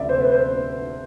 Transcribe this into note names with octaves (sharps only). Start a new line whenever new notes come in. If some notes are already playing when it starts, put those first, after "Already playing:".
Already playing: D2 C3 F3 A3 D5 E5
C5
B4
C5